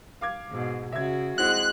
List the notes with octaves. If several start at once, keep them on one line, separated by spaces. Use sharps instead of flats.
F5 D6 G#6
G#2 B2
C#3 F#4 E5 G#6
G#3 C4 E4 F#4 F#6